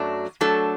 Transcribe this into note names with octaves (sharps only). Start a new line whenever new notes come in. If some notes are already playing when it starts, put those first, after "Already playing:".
Already playing: F#2 F#3 A3 D4
F#3 A3 D4 A4